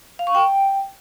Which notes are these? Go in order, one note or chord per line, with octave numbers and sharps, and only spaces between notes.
F5
C#6
G5